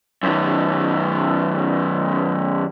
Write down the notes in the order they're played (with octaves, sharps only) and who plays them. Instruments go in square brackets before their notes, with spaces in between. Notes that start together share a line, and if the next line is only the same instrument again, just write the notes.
[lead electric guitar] F#2 D#3